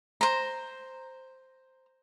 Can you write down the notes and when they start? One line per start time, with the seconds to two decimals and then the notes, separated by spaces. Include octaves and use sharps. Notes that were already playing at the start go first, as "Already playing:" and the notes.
0.21 C5 A#5